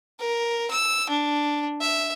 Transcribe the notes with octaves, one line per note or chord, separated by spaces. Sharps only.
A#4
E6
D4
E5